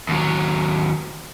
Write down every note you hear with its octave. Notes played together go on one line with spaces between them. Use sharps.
D#2 F#3